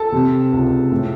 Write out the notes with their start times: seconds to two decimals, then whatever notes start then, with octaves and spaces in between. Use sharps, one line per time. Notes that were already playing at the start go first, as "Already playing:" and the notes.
Already playing: A4 A5
0.12 C3
0.52 C#2
0.91 A2